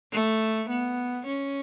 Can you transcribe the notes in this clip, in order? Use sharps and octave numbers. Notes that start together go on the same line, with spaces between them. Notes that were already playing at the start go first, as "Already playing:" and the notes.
A3
B3
C#4